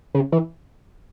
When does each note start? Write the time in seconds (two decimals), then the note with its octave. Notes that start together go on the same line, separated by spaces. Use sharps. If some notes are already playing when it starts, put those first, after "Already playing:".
0.15 C#3
0.32 E3